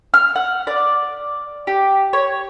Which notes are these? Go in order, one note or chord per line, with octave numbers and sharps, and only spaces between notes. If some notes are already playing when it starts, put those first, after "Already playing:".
F6
F#5
D5
G4
C#5